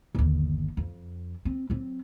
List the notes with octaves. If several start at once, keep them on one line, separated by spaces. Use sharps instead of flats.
G1 D#2
F2
C4
F#3 C4